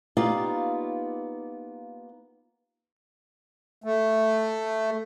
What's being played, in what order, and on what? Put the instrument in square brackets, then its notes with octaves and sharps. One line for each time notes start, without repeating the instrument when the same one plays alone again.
[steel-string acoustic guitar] A#3 B3 D#4 F4 G4 D5
[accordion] A3